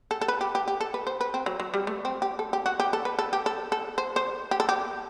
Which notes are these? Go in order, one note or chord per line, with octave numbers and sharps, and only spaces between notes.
A4
A4
B4
G4
G4
G4
A4
B4
C5
B4
C4
F#3
F#3
G3
A3
C4
G4
A4
G4
F#4
G4
A4
B4
A4
G4
A4
A4
C5
C5
G4
A4
G4